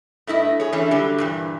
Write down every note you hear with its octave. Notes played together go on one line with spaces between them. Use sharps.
G2 A3 E4 D#5
G#4 C#5
E3 A3 C#4 D4
D3 F#3 G3
G2 A#2 E3